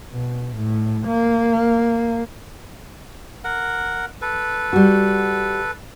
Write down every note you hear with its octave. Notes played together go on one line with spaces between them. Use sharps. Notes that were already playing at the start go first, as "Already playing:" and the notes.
B2
A2
A#3
A#4 F#5
A4 B4
G3 F#4